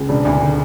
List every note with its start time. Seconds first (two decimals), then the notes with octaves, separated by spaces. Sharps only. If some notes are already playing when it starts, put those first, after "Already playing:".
Already playing: C#2
0.09 E1 D4
0.25 D2
0.41 D3